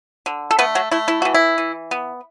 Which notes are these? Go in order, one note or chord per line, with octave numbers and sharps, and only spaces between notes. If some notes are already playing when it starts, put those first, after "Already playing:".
D3
A4
A3 B3 B4
F#3 F#4
A3 E4
E4
E3 F#4
E4
E3
B3